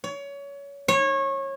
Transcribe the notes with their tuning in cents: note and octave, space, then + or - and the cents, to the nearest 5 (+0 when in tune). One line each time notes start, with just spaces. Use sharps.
C#5 +25
C#5 -25